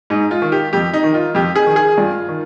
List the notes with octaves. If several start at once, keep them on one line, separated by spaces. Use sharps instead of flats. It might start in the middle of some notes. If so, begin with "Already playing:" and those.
G#2 D#4
F4
D#3
G4
F2 G4
D#4
D#3
F4
F2 G4
G#4
D#3
G#4
G2 F4
D#3